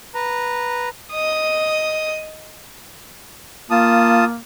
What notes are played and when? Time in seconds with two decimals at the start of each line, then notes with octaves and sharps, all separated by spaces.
0.14 B4 A#5
1.13 D#5 D#6
3.71 A#3 F4 A5 D#6